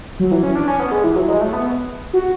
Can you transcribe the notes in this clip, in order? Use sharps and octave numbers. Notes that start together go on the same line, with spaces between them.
F#3
E3
C#4
D4
C#4
B3
G#3
E3
F#3
G#3
A3
B3
F#4